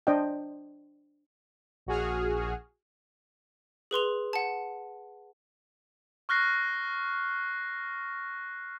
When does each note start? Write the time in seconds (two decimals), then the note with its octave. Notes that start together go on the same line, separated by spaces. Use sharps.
0.07 D4 C5 D5 D#5 G5
1.86 A#1 F#4 G#4 F6
3.91 G#4 B4 C6 F7
4.33 F#5 A5
6.29 C#6 F6 F#6 A#6 C7